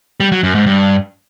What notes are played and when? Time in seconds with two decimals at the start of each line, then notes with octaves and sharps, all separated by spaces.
0.20 G3
0.32 F#3
0.43 F#2
0.55 G#2
0.66 G2